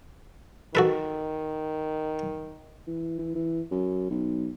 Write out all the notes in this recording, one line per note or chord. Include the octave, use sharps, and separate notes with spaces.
D#3 F#4 A4 B4
E3
E3
E3
F#2
B1